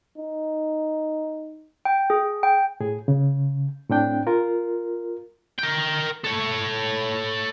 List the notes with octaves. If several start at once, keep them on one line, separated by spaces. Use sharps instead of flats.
D#4
G5
G#4
G5
A2 G#4
C#3
A2 C4 D4 G5
F4 A#4
A#4 G5
A4 C#5